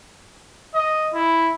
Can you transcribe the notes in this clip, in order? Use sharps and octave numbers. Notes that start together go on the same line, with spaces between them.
D#5
E4